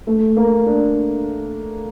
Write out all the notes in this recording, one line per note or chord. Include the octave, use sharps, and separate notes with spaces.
A3
A#3
D4